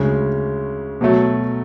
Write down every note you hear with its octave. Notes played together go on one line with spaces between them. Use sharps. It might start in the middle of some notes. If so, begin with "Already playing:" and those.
Already playing: D2 C#3 G#3 C#4
B2 F#3 A3